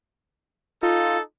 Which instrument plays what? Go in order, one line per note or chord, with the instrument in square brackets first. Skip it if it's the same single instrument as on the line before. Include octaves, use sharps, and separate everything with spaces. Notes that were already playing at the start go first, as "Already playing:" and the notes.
[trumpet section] D#4 A4 [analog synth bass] F4